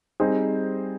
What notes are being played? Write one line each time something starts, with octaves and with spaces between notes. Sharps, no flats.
G3 C4 D#4 G#4 C5